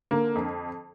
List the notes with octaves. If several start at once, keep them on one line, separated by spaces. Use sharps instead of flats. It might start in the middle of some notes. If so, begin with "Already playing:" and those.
D3 A#3
F2